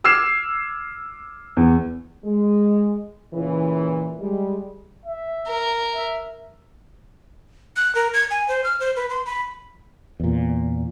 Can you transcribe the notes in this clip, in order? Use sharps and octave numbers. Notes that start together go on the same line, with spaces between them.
D6 E6 F6 G#6 C7 E7
E2
G#3
A#2 C#3 E3
G3 G#3
E5
A#4
E5
F#6
A#4
G#6
G#5
C5
F6
C5
B4
C6
B5
E2 A#2